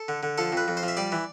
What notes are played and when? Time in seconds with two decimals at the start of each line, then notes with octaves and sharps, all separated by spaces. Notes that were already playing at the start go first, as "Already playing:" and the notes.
Already playing: A4
0.08 D3
0.23 D3
0.38 F3 A4
0.52 F2 B4
0.68 F2
0.77 C5
0.83 F3
0.88 E5
0.97 G3 D5
1.12 E3